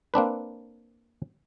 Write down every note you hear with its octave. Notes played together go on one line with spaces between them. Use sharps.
A#3 C4 D4 B4